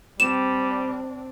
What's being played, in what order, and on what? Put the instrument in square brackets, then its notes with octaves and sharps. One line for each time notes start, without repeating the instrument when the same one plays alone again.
[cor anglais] G3 [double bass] C4 D4 [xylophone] E7